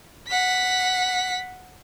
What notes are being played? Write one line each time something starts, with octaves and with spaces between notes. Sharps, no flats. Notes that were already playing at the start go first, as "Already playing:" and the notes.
F#5 B6